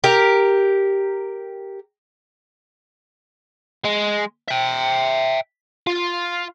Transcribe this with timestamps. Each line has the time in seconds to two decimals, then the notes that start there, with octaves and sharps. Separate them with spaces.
0.04 G4 A#4
3.84 G#3
4.48 E5 G5
5.87 F4